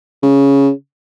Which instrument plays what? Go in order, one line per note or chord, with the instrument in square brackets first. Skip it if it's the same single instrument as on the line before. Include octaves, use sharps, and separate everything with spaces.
[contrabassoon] C#3